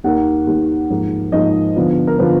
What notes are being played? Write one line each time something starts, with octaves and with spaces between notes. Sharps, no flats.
D#2 D#3 A#3 F#5
D#2 D#3 A#3
G#2 F3 A#3 D#4
G#2 F3 A#3 D#4 D#5
D3 F3 B3 F4
A#4
D3 F3 B3 F4 B4